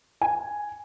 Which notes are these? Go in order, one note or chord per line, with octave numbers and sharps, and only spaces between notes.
G#5